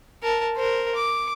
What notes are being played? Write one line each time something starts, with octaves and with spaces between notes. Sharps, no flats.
A#4 A5
A#4 C5
D6